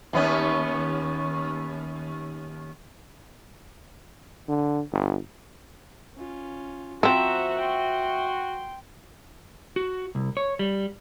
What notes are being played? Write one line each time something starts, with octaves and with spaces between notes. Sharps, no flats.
D#2 B3 C#4
D3
G1
C#4 F4
F3 C4 F#4 C5 E5 A#5
G5 C6
F#4
C2
C#5
G3